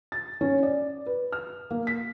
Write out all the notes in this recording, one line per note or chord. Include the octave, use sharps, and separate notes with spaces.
A6
C#4
D5
B4
F6
A#3
B6